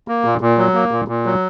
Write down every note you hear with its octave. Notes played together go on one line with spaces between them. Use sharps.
A#3
A#2
A#2
F#3
A#3
A#2
A#2
F#3